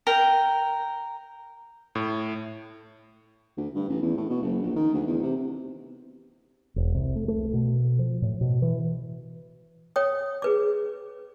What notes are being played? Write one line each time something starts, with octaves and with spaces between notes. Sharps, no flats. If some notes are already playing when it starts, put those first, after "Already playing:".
A#4 G5
A2
D2
G2
A1
E2
A2
B2
F#1
A#1
D#3
D2
E2
C3
E1
C2
A3
A3
B2
F3
A2
B2
E3
C#5 G5 D#6
G#4 B4 D6